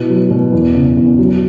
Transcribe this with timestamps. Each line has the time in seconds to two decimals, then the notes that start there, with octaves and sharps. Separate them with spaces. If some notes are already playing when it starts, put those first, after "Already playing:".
Already playing: B2 E4
0.09 F#3
0.31 B2
0.52 E2
0.75 C#3
0.97 E2
1.18 F#3